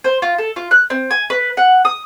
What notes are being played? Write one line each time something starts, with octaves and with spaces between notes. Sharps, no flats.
C5
F4
A4
F4
F#6
C4
G#5
B4
F#5
D#6